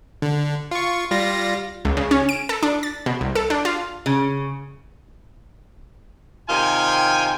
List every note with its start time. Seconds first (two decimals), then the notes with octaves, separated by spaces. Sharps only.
0.22 D3
0.71 F4 C#6
1.11 G3 F4 A#6
1.85 C#2
1.97 C#3
2.11 C#4
2.29 D7
2.49 A4
2.63 D4
2.83 A6
3.06 B2
3.21 C2
3.35 A4
3.50 D4
3.65 F4
4.06 C#3
6.49 C3 D#3 F4 G5 G#5